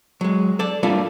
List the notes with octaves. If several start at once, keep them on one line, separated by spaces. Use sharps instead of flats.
F#3 G#3
A4 D5
G3 A3 A#3 D4 F4 A4